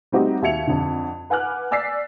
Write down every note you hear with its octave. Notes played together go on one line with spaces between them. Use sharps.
G3 A3 C4 D#4 F#4 G4
D#2 F#4 E5 G#6 C#7 F7
F2 D3
B4 F#5 G#5 D6 F6 F#6
D5 G#5 E6 A6 B6 C7